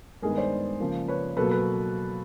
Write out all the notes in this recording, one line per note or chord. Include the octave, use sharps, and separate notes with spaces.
G2 D#3 G#3 B3 G#4 A#4
C5 D5
C#3 F3 A#3
B4 C#5
B2 F#3 A#3 A4 B4
A4 B4